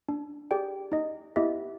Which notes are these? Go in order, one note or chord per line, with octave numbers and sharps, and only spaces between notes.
D4
G4 G#4 D5 G5
D#4 D#5
B3 E4 G4 D#5 E5